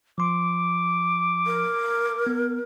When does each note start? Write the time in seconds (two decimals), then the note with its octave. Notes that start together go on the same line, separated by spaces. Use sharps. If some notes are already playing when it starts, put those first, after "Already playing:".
0.18 F3 C6 D6
1.46 A#4
2.27 B3